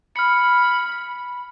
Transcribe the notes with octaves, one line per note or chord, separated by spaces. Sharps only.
B5 F6 C#7